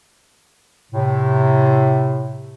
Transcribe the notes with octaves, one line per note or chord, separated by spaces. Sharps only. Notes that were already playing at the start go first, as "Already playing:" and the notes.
A2 C3